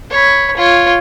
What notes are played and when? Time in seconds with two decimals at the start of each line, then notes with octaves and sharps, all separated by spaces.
0.10 C#5 B5
0.56 F4 C#5